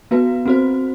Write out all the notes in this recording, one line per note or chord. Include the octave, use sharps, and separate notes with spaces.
B3 F#4 B4
C4 F#4 C5